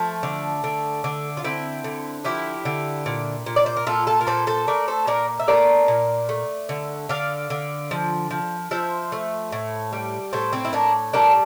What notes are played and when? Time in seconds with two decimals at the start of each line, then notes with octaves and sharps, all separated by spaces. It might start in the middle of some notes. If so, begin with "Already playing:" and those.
Already playing: F3 A3
0.23 D3
0.64 D3
1.04 D3
1.37 F4
1.44 D3 C4 E4
1.84 D3
2.25 F3 E4 G4
2.65 D3
3.06 A#2
3.46 A#2
3.56 D5
3.66 C5
3.77 A#4
3.87 A#2 F4 A4
4.07 F4 A4
4.21 A#4
4.27 A#2 A4 C5
4.47 A4 C5
4.67 A3 A#4 D5
4.88 A4 C5
5.07 A#2 A#4 D5
5.40 E5
5.48 A3 A#4 D5
5.88 A#2
6.29 A3
6.69 D3
7.09 D3 D5 F5
7.50 D3
7.91 F3
8.31 F3
8.71 F3 C5 E5
9.12 A3
9.52 A2
9.93 G3
10.33 A2 A4 C5
10.53 C4 E4
10.65 E4
10.73 A2 A#3 D4
11.13 G3 A#3 D4